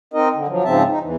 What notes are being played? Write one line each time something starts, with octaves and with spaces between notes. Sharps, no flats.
C4 D#4 A#4 D#5
D3
F3 F#3
G#2 C#3 F3 C4 E5 A5
D#4
E2 E3